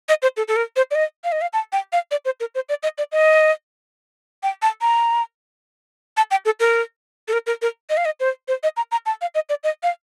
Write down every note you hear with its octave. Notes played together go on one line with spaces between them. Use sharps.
D#5
C5
A4
A4
A#4
C5
D5
D#5
F5
D#5
F5
A5
G5
F5
D5
C5
A#4
C5
D5
D#5
D5
D#5
G5
A5
A#5
A5
G5
A4
A#4
A4
A#4
A#4
A#4
D#5
F5
D#5
C5
C5
D#5
A#5
A#5
A5
F5
D#5
D5
D#5
F5